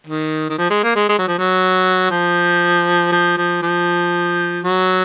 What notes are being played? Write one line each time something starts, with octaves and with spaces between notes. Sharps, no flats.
D#3
D#3
F3
G#3
A#3
G#3
G#3
F#3
F3
F#3
F3
F3
F3
F3
F#3